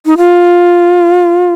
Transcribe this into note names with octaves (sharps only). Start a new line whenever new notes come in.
D#4
F4